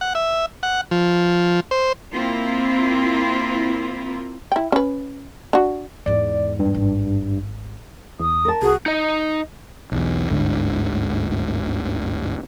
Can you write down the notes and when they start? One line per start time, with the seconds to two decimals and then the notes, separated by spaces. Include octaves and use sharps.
0.01 F#5
0.15 E5
0.63 F#5
0.91 F3
1.71 C5
2.13 A#3 C4 E4 F4
4.52 E4 G5
4.72 C#4 B4
5.53 D4 F#4
6.06 E2 G#2 D5
6.59 G2
6.74 G#1
8.20 E2 D#6
8.45 A#4 A5
8.62 C2 F#4 G#4
8.86 D#4 D#5
9.92 B1 E2
10.29 G1 D2 G#2 D3